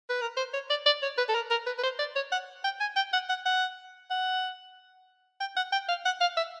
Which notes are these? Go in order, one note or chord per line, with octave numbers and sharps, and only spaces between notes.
B4
A#4
C5
C#5
D5
D5
C#5
B4
A4
A#4
A#4
B4
B4
C5
D5
C#5
F#5
G5
G#5
G5
F#5
F#5
F#5
F#5
G5
F#5
G5
F5
F#5
F5
E5